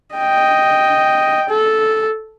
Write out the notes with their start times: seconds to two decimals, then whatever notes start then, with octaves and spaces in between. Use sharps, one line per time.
0.15 D#5 G5
1.49 A4